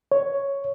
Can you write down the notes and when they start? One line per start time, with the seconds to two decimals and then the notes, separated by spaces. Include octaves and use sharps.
0.12 C#5